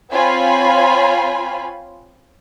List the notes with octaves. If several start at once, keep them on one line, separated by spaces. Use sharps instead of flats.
C4 F4 C#5 G#5 B5